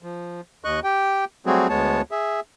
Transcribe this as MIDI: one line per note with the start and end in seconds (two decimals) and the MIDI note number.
0.03 0.41 53
0.64 0.80 39
0.64 0.80 75
0.64 0.80 85
0.64 0.80 90
0.84 1.25 67
0.84 1.25 79
1.46 1.68 54
1.46 1.68 55
1.46 1.68 57
1.46 1.68 60
1.46 1.68 66
1.46 1.68 68
1.69 2.01 38
1.69 2.01 56
1.69 2.01 59
1.69 2.01 73
1.69 2.01 81
2.11 2.40 68
2.11 2.40 76